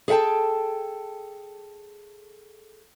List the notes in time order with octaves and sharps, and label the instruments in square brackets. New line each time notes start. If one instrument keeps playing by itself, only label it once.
[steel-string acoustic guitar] G#4 A4 E5 G5 A5